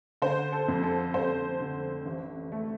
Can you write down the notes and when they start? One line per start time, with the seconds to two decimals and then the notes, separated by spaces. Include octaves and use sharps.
0.22 D3 C5
0.52 A4
0.68 F2
0.83 A4
1.14 F2 C5
1.60 D3
2.05 A1
2.52 A3